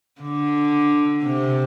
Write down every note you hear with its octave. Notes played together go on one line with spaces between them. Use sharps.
D3
C3